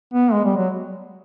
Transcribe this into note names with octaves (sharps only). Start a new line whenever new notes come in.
B3
G#3
G3
F#3